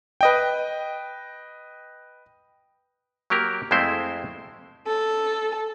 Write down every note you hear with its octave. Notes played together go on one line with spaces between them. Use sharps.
B4 D#5 G5
F#3 A#3 G4 A#4
F2 G#3 A3 C4 E4 C5
A4